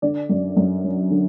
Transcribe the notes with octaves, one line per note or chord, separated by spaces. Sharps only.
D3 D5
F#2
F#2
F#3
D3